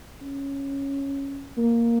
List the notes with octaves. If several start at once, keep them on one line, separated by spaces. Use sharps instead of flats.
C#4
A#3